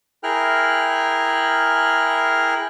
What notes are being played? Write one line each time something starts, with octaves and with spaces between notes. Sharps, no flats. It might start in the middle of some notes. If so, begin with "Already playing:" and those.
E4 G#4 A#4 G5 F6 F#6